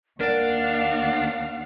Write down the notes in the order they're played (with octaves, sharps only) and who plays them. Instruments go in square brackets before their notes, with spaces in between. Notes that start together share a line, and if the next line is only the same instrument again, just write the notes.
[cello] D#2 F5 [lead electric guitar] D4 [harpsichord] A#4 D5 [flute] F#5